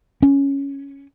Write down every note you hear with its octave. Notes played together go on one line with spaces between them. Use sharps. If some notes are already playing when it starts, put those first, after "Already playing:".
C#4